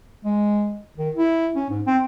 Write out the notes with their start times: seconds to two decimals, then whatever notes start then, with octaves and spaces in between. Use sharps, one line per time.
0.25 G#3
0.98 D#3
1.16 E4
1.56 C#4
1.70 G#2
1.86 C4